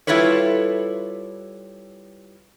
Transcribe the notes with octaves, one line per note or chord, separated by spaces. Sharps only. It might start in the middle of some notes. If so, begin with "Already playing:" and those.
G3 E4 F4 A4 B4 C#5